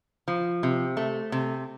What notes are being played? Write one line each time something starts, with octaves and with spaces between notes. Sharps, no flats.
F3
C3
A3
C3